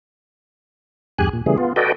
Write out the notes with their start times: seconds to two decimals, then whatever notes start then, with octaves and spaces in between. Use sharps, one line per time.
1.18 E2 G2 G4 G#4 G#5 F#6
1.33 A#2
1.46 C#3 E3 G3 A3 G#4
1.58 B3 F4
1.76 F#4 A4 B4 D5 D#5 G5